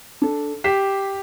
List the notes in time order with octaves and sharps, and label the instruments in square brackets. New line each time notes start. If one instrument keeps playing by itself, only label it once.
[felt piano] D4 A4
[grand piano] G4 [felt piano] B6 C7 E7